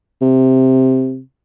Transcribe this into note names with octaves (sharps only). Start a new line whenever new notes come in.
C3